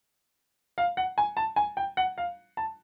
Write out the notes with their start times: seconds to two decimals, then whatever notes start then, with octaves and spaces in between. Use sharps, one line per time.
0.78 F5
0.97 F#5
1.18 G#5
1.37 A5
1.56 G#5
1.77 G5
1.97 F#5
2.18 F5
2.57 A5